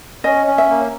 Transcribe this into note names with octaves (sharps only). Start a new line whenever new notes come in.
C#4 D#5
C#4
E5
A#3